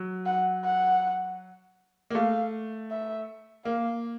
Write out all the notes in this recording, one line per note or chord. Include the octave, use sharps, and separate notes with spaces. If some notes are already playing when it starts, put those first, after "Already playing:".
Already playing: F#3
F#5
F#5
A#3
A3 F5
E5
A#3 F5